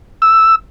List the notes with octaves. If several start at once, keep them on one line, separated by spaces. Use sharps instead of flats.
E6